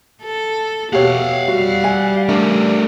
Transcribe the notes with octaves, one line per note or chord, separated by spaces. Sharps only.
A4
B2 G4 C#5 F5 F#5
G3 F#4
G#5
A3 D4 A#4